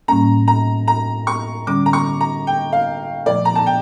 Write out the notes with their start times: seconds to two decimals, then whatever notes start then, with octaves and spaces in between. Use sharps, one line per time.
0.08 A2 G3 A#3 C#4 A#5
0.48 A#5
0.88 A#5
1.27 C#6
1.67 D3 G3 C#4 D6
1.86 A#5
1.93 C#6
2.21 A#5
2.47 G5
2.73 F5
3.26 A#2 F3 A3 D5
3.45 A#5
3.55 A5
3.66 G5